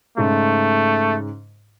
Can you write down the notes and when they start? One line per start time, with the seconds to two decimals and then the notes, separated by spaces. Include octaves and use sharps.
0.17 G#2 C#3 A3